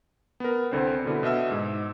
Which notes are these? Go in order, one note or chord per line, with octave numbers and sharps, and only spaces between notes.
B3 A#4
C2 D3 C4 C5
B2 D3 E4
B2 D#5 E5 E6
G#2